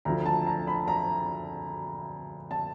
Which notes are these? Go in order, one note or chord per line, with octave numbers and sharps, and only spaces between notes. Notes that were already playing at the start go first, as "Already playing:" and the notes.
D2 D3 F3 A#5
A5
A#5
B5
A#5
A5